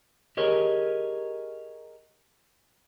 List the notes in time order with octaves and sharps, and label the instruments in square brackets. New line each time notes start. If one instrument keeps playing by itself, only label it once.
[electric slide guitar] G4 G#4 A#4 C#5 D#5